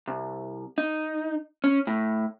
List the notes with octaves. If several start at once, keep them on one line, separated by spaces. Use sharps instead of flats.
C2
D#4
C#4
A2